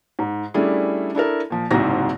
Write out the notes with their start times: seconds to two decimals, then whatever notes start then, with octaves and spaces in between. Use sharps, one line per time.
0.19 G#2
0.54 G3 A3 C#4 D4 E4 G#4
1.15 D4 E4 A4 A#4
1.50 A#2 F3
1.71 F#1 C2 G#2 F#3 C4 A#6